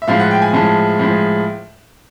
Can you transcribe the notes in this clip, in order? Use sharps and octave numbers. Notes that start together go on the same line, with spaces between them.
E5
A2 F3 G#3 F5
F#5
G5
G#5
A2 F3 G#3 A5
A2 F3 G#3